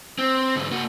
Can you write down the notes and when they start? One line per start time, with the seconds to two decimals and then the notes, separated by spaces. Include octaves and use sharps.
0.19 C4
0.56 G#2 D3
0.71 A#3 F#4